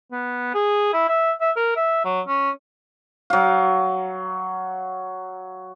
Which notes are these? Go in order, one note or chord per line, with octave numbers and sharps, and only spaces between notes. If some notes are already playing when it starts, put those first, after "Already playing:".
B3
G#4
E4
E5
E5
A#4
E5
F#3
C#4
F#3 F5